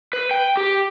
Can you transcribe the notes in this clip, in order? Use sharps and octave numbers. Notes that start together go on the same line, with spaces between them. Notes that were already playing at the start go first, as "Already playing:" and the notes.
B4
G5
G4